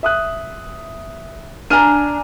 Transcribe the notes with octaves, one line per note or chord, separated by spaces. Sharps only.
E5 D#6 F#6
D4 D5 G#5 A#5 F6 D#7